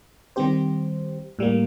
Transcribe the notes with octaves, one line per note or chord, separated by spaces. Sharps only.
D#3 G3 C4 G4 C5
A2 G3 A#3